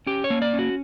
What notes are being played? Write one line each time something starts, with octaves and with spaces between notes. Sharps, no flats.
C#4 G4
C#5
A#3
D5
C#4
F#4